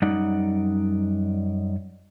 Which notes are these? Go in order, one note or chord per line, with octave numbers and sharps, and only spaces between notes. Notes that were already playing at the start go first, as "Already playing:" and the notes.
F#2 G3 D#4 D5 F#5